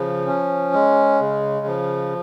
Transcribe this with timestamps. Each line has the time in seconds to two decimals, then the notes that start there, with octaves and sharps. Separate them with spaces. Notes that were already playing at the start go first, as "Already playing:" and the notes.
Already playing: C#3 F3
0.27 C#4
0.73 G#3
1.20 C#3
1.66 F3